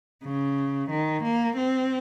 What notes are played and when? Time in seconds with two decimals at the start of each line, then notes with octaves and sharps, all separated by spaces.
0.25 C#3
0.91 D#3
1.24 A#3
1.57 C4